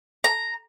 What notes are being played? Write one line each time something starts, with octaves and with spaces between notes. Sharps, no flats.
A#5